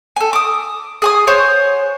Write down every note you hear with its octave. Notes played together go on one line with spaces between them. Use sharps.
A4 G#5
D6 D#6
G#4 G#5 D#6
C5 C#5 F#5 G#5